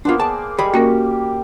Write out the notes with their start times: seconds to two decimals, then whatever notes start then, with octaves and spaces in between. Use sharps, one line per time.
0.05 A#3 B3 D4 F4 C5
0.20 G#4 C5 D5 A5
0.58 G3 G#3 G4 G#4 B5
0.74 A#3 C#4 F#4 G4 A#4